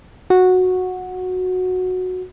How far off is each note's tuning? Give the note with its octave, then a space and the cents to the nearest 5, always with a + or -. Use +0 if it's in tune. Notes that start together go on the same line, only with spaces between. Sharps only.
F#4 -10